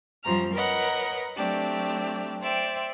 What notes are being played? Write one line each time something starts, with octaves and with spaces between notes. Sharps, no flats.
F#2 F3 G3 A#5 F6
A#4 B4 C#5 D#5 F#5
F#3 A3 C4 D4 G4
C5 D5 E5 G5